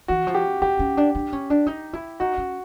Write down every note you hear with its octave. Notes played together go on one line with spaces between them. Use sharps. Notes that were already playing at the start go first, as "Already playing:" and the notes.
E3 F#4
F3
G4
C4 G4
C#4
D4
D4
C#4
D4
D#4
E4
D#4 F#4
C#4